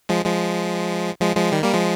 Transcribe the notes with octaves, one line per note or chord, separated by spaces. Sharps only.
F3 G#3
F3 G#3
F3 G#3
F3 G#3
D#3 G3
G3 A#3
F3 G#3